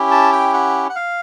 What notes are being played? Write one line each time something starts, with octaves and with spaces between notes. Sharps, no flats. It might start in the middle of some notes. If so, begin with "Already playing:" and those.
Already playing: C#4 E4 G4
A5
G5
F#5
F#5
F5